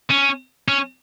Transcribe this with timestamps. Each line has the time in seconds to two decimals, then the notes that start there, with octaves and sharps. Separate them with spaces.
0.10 C#4
0.68 C#4